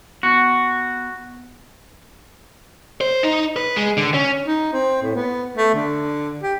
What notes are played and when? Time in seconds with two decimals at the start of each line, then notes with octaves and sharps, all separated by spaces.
0.23 B3 F#4
3.01 C5
3.23 D#4
3.56 B4
3.76 G#3
3.97 D3
4.14 C#4
4.47 D#4
4.73 C4
5.02 A2
5.15 B3
5.57 A3
5.74 D3
6.43 G4